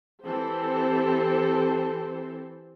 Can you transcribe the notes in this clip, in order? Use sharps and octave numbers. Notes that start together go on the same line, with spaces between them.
E3 C4 G4 A4 C5